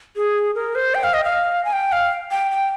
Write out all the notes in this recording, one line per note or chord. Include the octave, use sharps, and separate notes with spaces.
G#4
A#4
C5
G5
F5
D#5
F5
G#5
G5
F5
G5
G5